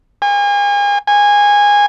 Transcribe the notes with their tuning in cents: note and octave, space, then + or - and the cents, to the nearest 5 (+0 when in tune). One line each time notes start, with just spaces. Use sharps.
G#5 -40
G#5 -20